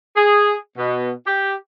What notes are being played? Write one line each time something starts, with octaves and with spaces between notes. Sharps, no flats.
G#4
B2
G4